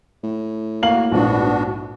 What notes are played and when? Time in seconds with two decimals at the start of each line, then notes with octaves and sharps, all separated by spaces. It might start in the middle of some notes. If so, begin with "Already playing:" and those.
0.24 A2
0.83 A#3 F#4 F5 F#7
1.12 A#1 F2 G#2 B3 D4 F#4